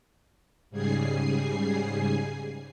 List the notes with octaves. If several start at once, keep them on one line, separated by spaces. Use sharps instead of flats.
G#2 C#3 G3 G#4 G#5 C7